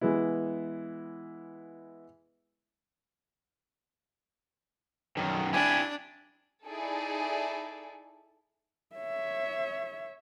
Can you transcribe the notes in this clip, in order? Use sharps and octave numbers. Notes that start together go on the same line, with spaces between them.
E3 G#3 B3 E4
F#2 D#3
D4 E4 G4 G#5
D#4 E4 G#4 A4 D5
C#5 E5